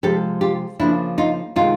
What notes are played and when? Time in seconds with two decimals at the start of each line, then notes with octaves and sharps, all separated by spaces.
0.03 C3 F3 G#3 G4 A4
0.41 F4 G4
0.80 C#3 F3 A#3 D4 E4
1.18 D#4 F4
1.56 C3 D#3 G#3 D#4 F4